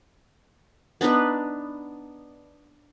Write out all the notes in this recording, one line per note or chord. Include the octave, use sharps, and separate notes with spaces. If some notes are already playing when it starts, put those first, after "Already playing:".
B3 D4 D#4 B4